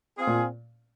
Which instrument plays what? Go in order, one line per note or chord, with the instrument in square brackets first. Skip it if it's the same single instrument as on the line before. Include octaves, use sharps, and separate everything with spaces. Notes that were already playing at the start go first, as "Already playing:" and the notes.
[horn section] C4 F4 G#4
[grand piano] A#2